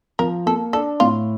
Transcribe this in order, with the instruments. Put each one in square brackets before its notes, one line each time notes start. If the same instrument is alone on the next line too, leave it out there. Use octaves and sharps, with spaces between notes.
[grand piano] F3 [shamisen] A#4
[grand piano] A#3 [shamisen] A4
[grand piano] D4 [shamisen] A4
[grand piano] A2 [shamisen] F4